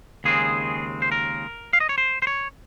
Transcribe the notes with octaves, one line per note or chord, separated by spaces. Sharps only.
D#2 C#3 G#3 C4 G#4
C5
A#4
F5
D#5
C#5
C5
C5
C#5